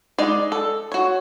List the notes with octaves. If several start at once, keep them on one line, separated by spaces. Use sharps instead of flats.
G#3 D#4 D5
A4
F#4 C#5